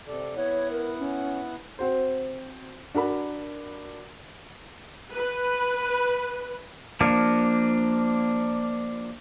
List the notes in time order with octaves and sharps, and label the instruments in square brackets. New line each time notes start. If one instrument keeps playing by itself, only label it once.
[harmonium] C3 A4 D5
[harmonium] B3 E4 F#5 [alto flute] C#5
[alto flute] A#4
C#4
[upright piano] C4 F#4 C5
D4 F#4 A#4 B5
[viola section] B4
[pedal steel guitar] F3 A#3 D4